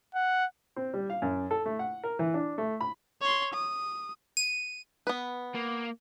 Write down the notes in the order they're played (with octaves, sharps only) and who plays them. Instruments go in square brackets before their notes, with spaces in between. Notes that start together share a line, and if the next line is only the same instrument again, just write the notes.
[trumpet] F#5
[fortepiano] C4
G3
F5
F#2
A4
A3
F#5
A#4
E3
D4
A3
B5
[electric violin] C#5 C6
D#6
[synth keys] D#7
[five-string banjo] B3 B4
[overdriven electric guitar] A#3